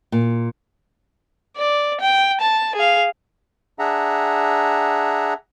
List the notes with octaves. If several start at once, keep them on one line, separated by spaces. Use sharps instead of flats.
A#2
D5
G5
A5
G#4 F5
D4 G#4 E5 F#5 A#5